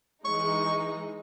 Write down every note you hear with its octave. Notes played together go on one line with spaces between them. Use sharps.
E3 G#3 D#4 C#6